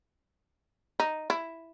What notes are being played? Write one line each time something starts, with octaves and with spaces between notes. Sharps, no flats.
D#4
E4